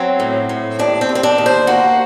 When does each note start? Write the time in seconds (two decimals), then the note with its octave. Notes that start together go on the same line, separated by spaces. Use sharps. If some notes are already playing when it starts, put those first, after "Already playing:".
Already playing: F#3 C4
0.20 A2
0.49 A2
0.79 D#2 D4
1.01 C4
1.09 D#2
1.15 C4
1.23 D4
1.38 D#2
1.46 C5
1.67 A#3 F#4